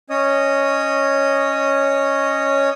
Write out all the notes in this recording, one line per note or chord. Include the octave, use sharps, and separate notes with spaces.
C#4 C#5 D#5 D#6